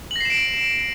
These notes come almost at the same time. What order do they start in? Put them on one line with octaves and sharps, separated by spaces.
F#7 A#6 C7 E7 D7